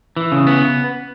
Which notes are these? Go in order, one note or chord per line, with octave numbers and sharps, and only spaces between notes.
E3
C#3
B3